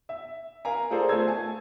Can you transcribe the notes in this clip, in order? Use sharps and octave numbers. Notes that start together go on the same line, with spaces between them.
E5
A#4 F5 G#5 A#5
F4 G#4 A4 C5 D5 A#5
A3 F4 A4 C5 E6 G#6
G#5 A5